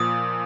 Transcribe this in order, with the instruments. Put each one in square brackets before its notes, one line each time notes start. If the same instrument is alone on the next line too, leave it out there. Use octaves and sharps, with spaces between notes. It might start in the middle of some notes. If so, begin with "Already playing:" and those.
Already playing: [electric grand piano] A#2 F3 [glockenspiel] D#6